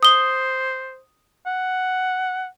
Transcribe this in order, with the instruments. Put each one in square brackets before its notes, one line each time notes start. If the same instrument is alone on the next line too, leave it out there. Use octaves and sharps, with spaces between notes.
[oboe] C5 [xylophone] D#6 G7
[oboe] F#5